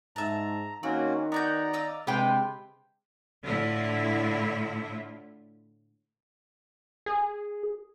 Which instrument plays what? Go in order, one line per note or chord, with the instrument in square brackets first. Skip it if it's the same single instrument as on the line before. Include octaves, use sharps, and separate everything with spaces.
[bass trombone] G#2 [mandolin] E5 A5 [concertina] A#5
[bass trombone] D#3 [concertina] A#3 C#4 F#4 [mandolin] C4
[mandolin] B3 F#4 G6 [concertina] D5 A#5
[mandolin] D#5 F5 E6
[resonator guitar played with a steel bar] C3 G5 [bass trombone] G#3 [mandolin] G4 C5 [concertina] B4 B5
[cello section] A2 D3 E4 F4 E5
[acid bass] G#4